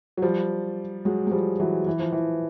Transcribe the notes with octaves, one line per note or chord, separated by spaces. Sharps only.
F#3
F3 G3
F#3 G#3
G#3
F3 G3
E3 F#3
E3
F3
E3